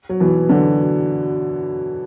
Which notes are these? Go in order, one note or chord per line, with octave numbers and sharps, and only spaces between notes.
F#3
B2 E3
D3 F#3